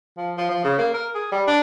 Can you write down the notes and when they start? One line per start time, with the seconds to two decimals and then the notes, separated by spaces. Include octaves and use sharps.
0.18 F3
0.38 F3
0.50 F3
0.65 C#3
0.79 A#3
0.94 A#4
1.15 G#4
1.32 G3
1.48 D4